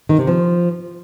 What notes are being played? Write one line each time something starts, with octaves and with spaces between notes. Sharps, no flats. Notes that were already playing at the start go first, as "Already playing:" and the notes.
D#3
C3
F3